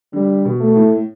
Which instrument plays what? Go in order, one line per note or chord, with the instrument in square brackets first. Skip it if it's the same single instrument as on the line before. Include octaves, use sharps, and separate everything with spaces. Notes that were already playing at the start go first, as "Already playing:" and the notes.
[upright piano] D3 [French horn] G3
[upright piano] B2
[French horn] A3
[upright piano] A2